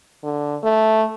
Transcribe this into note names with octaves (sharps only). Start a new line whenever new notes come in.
D3
A3